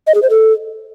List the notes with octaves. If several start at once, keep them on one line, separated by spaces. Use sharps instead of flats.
D#5
G#4
C5
A4